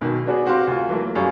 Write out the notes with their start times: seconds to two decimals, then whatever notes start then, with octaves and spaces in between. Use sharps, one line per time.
0.01 B1 B2 D#3
0.26 B3 D4 F#4 G#4
0.46 C4 F#4 G4 F5 C6
0.67 D2 F4
0.89 E3 F#3 A3 A#3
1.15 F#2 G3 G#4 F5 C#6